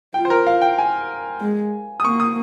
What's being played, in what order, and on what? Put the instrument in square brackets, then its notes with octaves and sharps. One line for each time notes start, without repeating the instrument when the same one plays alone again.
[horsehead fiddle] F4 [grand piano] G5
[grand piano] C5
A#4
F5
G5
G#5
[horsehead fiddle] G#3
[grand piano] D#6
[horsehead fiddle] A#3 [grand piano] C#6
[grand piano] D#6